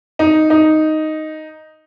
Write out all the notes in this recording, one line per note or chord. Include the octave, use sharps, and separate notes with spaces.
D#4
D#4